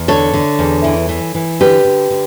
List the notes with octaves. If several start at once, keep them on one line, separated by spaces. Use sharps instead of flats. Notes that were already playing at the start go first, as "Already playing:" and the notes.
Already playing: E2
D3 A4 C#5
D3
E2
E3
E3
E3
D3 G4 B4
D3
D3